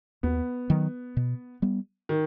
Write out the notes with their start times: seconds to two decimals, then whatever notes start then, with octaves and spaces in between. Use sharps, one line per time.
0.23 D#2 B3
0.70 D#3 F#3
1.17 B2
1.62 G3 B3
2.09 D#3